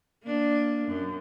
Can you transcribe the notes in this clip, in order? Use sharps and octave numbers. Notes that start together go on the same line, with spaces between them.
A#3 D4
F#2